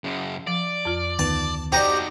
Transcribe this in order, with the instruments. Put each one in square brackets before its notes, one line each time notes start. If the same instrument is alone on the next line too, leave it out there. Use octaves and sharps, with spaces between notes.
[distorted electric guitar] F#2 C#3
[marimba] F3 [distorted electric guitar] D5
[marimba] F2 F4
[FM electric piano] D2 D#3 B3 [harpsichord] A5
[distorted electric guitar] D#4 F#4 [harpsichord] G4 A#5 [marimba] C5 D5